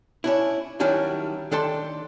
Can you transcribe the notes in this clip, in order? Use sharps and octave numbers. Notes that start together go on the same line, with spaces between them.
C#4 D4 E4
D#3 F#3 G3 C#4 D4 E4
D#3 D4 A4 G5 A5 C6